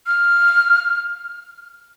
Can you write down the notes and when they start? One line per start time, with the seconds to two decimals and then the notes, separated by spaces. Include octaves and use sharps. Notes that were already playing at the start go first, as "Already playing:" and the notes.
0.06 F6